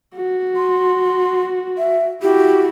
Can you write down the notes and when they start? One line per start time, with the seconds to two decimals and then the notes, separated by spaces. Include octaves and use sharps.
0.16 F#4
0.56 C6
1.78 E5
2.22 E4 F#4 G4